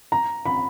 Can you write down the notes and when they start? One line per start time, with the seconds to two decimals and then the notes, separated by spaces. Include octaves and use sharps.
0.12 A#5
0.46 B5